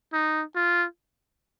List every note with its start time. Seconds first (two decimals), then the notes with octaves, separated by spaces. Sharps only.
0.13 D#4
0.56 F4